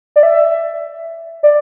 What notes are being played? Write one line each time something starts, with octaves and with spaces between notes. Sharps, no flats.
D5
E5
D5